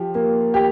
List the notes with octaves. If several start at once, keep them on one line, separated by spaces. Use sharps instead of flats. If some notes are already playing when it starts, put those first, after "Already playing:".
Already playing: F3 G4
A#3
G4